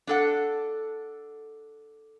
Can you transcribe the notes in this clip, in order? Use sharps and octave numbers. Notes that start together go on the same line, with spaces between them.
D4 A4 F#5